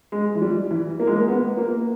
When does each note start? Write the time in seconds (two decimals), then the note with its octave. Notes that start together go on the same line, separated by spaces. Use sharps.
0.12 G#3
0.35 E3
0.42 G3
0.71 E3
1.00 A#3
1.07 G#3
1.15 A#3
1.28 B3
1.57 A#3